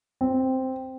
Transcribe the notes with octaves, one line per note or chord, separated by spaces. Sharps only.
C4